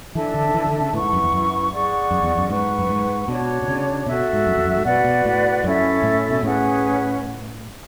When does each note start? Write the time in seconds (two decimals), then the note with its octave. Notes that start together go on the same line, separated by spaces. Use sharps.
0.14 E3 D4 A4 E5 A5
0.34 D3
0.49 D3
0.54 E3
0.67 D3
0.80 C#3
0.93 A2 E4 B4 F#5 C#6
1.03 G#2
1.13 F#2
1.23 E2
1.32 F#2
1.71 G#4 D5 F#5 C#6
2.11 F#2
2.23 E2
2.38 F#2
2.50 G#2 B4 F#5 C#6
2.78 F#2
2.89 G#2
3.28 B2 D4 F#4 C#5
3.62 B2
3.68 C#3
4.06 B2 F#4 A4 E5
4.33 G#2
4.47 F#2
4.57 E2
4.65 F#2
4.76 G#2
4.85 B2 F#4 B4 D5 F#5
5.04 B2
5.25 A2
5.64 F#2 C#4 E4 A4 E5
6.03 A2
6.30 B2
6.43 A2 C#4 G#4 B4 F#5